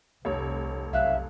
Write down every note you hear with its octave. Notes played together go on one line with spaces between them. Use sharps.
F1 C2 C#5
B1 E5 F5 F#6